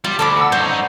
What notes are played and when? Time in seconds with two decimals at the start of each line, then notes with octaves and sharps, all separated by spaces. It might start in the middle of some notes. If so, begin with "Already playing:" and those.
0.04 G3 F4
0.19 D2 A4 B5 D6
0.37 F#5 E6
0.52 G2 D#4 C5 C#5
0.64 F#5